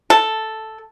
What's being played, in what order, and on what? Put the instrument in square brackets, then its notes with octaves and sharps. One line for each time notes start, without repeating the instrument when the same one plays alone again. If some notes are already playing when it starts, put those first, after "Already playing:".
[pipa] A4